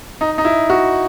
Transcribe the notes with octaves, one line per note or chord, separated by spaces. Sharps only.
D#4
D#4
E4
F#4